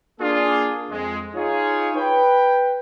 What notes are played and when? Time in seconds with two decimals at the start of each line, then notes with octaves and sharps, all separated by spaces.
0.21 A#3 D4 F4 G#4
0.91 F2 G#3
1.35 D#4 F4 G#4 C#5
1.97 B4 G5